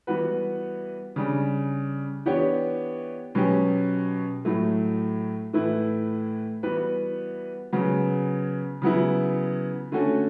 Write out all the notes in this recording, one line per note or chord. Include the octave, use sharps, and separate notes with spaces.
E3 G3 B3 F#4 B4
C#3 G3 D4
E3 B3 D4 G4 C#5
B2 F#3 C#4 G4
A2 F#3 A3
A2 E3 A3 E4 B4
E3 G3 B3 F#4 B4
C#3 F#3 B3
C#3 F#3 B3 E4
D3 A3 C#4 F#4 A4